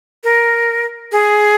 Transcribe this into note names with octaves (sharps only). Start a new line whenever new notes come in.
A#4
G#4